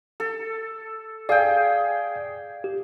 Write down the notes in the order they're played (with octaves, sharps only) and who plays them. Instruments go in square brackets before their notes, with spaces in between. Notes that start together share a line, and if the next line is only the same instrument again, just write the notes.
[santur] A4
[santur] G#4 G5 [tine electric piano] D5 F5
[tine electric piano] G4